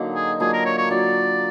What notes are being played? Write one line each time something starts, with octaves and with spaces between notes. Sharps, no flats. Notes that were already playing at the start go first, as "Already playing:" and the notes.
Already playing: D3 F#3 A#3 D#4
G#4
F#3 A#3 D4 F4 G#4
A#4
C#5
C#5
F#3 A#3 D4 F4 D5